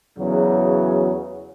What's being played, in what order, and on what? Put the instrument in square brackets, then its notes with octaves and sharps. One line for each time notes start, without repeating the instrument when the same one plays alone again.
[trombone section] E2 C#3 F#3